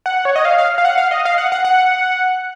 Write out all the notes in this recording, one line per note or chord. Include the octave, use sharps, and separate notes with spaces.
F#5
C#5
D#5
F5
F5
F5
F#5
F5
D#5
F5
F#5
F#5
F#5